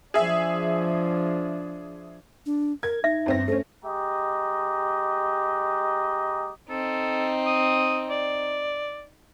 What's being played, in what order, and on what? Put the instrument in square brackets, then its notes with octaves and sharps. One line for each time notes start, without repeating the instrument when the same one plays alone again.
[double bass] F3 D4 [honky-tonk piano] G#4 E5
[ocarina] D4
[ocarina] A#4 [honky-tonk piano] G#6
[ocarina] D#4 [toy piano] E5
[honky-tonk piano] G1 C4 A#6
[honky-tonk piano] A3 C#4 [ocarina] C5
[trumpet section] G#3 G4 D#5 A#5
[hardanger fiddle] C4 D#4 [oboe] A4
[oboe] D#6
D5